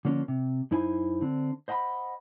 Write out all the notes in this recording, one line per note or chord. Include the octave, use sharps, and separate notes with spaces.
D3 F3 A#3 C#4 D4
C3
F#2 D#4 E4 C5 G#5
D3 C4 D4
C5 D#5 F#5 G#5 B5